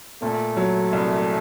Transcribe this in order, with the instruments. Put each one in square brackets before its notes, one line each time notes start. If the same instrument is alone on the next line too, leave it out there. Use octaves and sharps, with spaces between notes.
[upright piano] A#2 [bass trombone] A3
[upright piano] F#3
C2